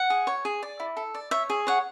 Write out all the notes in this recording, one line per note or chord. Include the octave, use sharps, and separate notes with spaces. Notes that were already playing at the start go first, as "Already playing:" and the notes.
Already playing: F#5
G#4
C#5
G#4
D5
E4
A4
D5
C#5 E5
G#4
C#5 F#5